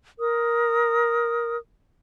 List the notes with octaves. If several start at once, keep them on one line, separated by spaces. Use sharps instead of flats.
A#4 D#6